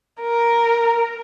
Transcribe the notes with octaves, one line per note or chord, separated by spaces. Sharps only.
A#4